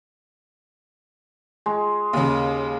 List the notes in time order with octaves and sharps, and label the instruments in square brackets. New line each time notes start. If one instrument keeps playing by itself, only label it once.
[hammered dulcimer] G#3
[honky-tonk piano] D#2 C#3